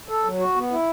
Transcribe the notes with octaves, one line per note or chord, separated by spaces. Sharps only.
A4
F#3
F#4
B3
E4